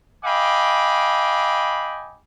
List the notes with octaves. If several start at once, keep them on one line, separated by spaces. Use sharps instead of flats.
D#5 F5 G5 G#5 B5 D6